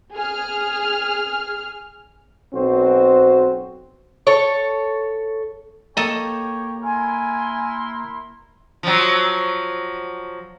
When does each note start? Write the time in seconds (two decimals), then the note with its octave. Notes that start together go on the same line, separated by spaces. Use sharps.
0.15 G#4 F6
2.54 B1 C4 F#4 C5
4.27 A4 C#5
5.97 A#3 G4 A4 C#5 D#5 G5 A#5
6.84 E4 A#4 G#5 C6
8.83 F3 F#3